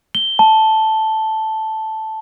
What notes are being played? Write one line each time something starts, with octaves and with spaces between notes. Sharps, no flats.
G7
A5